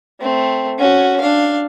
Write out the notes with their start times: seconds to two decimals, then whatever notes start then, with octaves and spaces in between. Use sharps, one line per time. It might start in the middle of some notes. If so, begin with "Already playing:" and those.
0.20 A3 C4
0.78 C#4 F#4
1.20 D4 F5